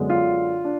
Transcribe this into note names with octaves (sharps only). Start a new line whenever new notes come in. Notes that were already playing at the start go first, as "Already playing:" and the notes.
Already playing: F#2 D3 G#3 B3 D4
F4
D4